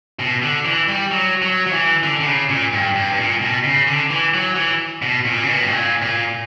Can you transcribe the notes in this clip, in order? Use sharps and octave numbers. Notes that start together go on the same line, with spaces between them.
B2
D3
E3
G3
F#3
F#3
F#3
E3
D3
D3
C#3
A#2
G2
G2
G2
A#2
B2
C#3
D3
E3
F#3
E3
B2
A#2
C#3
B2
G2
A#2
A#2